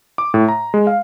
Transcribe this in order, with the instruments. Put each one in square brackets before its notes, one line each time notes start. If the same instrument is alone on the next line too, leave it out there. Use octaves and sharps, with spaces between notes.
[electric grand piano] D6
A2
A#5
G#3
F5